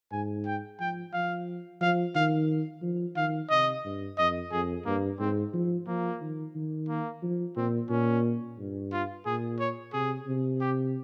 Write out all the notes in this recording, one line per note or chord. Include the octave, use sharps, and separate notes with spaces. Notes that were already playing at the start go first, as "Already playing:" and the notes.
G#2 G#5
G5
F3 G5
F3 F5
F3 F5
D#3 F5
F3
D#3 F5
C3 D#5
G2
F2 D#5
F2 G#4
G2 A#3
G#2 C4
F3
F3 A#3
D#3
D#3
A#3
F3
A#2 C4
A#2 C#4
G2
F4
A#2 G#4
C#5
C3 G#4
C3
G4